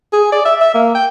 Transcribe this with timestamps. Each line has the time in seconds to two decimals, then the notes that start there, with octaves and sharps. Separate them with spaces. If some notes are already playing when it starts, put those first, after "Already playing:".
0.13 G#4
0.32 D5
0.45 E5
0.61 E5
0.74 A#3
0.95 G5